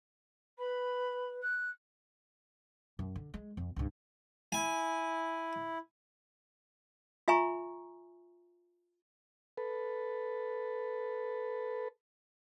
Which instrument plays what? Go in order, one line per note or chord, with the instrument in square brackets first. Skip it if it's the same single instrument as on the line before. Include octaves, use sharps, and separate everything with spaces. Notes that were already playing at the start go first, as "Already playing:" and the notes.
[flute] B4 [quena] B5
[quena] F#6
[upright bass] F#2
D3
G#3
F2
C#2 G2
[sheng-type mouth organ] E4 [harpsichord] G#5
[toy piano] F4 E5 G#5 A#5 C#6
[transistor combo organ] A4 B4